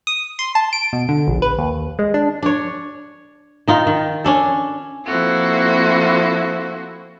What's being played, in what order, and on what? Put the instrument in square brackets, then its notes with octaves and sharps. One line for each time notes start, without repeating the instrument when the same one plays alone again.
[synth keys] D#6
C6
A5
D7
B2
D3
A#1
B4
D#2
G#3
D4
[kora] D4 C#5
D#3 D#4 F4
D#3
C#4 D4 A4
[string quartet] F3 A#3 C4 E4 F#4 A4